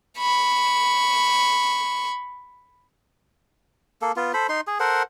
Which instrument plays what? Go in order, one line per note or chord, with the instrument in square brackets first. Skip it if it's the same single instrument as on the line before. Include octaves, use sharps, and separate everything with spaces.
[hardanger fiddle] B5 C#6
[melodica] A#3 A4
B3 F4
A4 C5 B5
D#4 C6
G#4
A4 A#4 C5 F#5